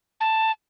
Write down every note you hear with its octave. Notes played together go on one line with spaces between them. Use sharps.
A5